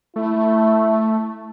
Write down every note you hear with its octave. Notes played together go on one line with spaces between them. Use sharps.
A3 E4